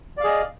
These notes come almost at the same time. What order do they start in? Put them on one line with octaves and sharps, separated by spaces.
D5 F5 G#4 D#5